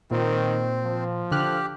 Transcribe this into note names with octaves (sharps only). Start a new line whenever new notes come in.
A#2 D#3 C4
F3
D3 G4 F6 F#6